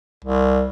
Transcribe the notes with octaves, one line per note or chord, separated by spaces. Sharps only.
C2